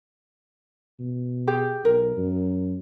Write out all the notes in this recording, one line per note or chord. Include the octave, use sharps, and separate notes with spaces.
B2
G4 G#4 G5
B1 A#4
F#2